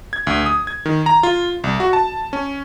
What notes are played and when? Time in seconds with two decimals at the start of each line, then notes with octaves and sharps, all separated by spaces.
0.13 G#6
0.27 D2
0.46 D#6
0.67 G#6
0.85 D#3
1.06 A#5
1.23 F4
1.64 C2
1.80 F#4
1.93 A5
2.33 C#4